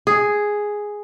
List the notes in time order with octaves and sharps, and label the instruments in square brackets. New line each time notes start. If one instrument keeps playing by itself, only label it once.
[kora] G#4